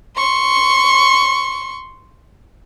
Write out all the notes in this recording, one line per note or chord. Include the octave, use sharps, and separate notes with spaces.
C6 C#6